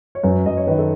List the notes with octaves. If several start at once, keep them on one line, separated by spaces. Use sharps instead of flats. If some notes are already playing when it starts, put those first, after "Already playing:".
C#5
F#2 B4
F#2 D#5
C#5
D#3 B4
A4